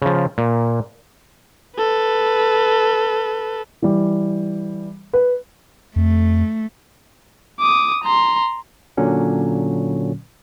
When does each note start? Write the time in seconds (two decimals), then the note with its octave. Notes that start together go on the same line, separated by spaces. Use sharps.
0.02 C#3 F3
0.38 A#2
1.77 A4 B4
3.82 E3 G3
5.13 B4
5.96 F2 A3
7.60 D6 D#6
8.03 A#5 C6
8.97 A#2 D3 F#3 C#4